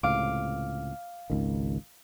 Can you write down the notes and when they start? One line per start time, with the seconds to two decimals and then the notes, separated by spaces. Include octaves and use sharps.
0.03 C#2 A2 C3 F5 D6
1.30 G#1 C#2 D#3